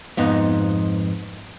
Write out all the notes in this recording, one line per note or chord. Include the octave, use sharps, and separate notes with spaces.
F2 G#2 B3 D#4